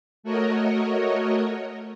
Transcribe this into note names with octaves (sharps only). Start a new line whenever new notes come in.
A3 F#4 A#4 C#5 D#5